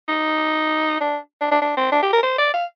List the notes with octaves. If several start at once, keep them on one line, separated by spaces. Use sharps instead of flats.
D#4
D4
D4
D4
D4
C4
D4
G4
A#4
C5
D5
F5